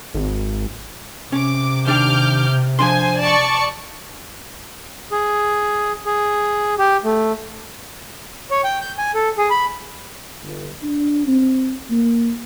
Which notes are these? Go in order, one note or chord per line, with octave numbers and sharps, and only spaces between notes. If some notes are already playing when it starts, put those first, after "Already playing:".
G#1
C3 C#4 D6
D#2 D4 G5 D6 F6 G6
F3 D4 C5 G#5 C6
D5 A5 C#6
G#4
G#4
G4
A3
C#5
G5
G6
G#5
A4
G#4
B5
G1
D4
C4
A#3